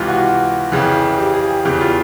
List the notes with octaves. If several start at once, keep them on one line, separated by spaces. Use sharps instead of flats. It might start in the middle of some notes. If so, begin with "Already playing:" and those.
Already playing: C#2 C3 E3 F4
F#4
F2 C#3 E3
G4
G#4
E2 C#3 E3 G4
F4